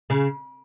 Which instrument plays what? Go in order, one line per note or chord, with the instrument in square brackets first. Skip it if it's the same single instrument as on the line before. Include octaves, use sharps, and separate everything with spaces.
[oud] C#3